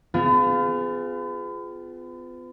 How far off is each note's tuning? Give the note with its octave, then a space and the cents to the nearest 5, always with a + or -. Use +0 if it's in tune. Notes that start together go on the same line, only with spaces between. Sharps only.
B3 +40 F4 +0 G#4 +0